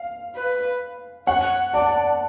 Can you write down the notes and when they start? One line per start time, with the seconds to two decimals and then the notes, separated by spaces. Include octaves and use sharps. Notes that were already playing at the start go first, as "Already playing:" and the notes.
Already playing: F5
0.36 B4
1.27 C#5 F#5
1.73 D5 A5